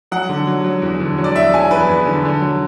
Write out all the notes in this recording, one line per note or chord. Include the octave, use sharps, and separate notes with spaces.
F#3 F#5
D3
F#3
F#3
E2
D3
F#3
D5
E2 E5
F#3 G#5
E2 B4
E2
D3
D3
F#3